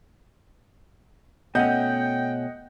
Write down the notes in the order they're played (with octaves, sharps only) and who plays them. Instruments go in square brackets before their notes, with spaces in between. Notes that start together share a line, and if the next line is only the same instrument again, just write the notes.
[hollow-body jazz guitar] B2 A3 C#4 [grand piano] D#5 F#5 G6 [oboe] G5